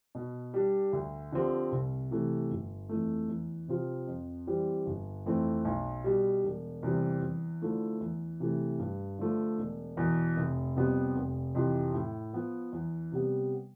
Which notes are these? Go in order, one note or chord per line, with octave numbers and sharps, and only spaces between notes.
B2
G3 D4
D2
D3 F3 C4 G4
C2
C3 E3 A3
G1
F2 E3 A3
E2
C3 F3 C4 F4
F2
E3 G3 C4
G1
F2 E3 A3 C4
B1
B2 G3
E1
E2 C3 G3 C4
E2
D3 F3 A3 E4
E2
C3 E3 A3
G2
D3 F3 A3
E1
E2 B2
F1
F2 C3 G3 B3
F1
F2 C3 E3
A2
F3 B3
E2
C3 G3 B3